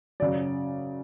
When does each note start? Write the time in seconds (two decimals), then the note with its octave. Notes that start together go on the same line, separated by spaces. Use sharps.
0.20 F#2 C#3 F#3 D5